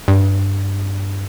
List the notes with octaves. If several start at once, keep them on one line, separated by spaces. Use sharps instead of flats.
G2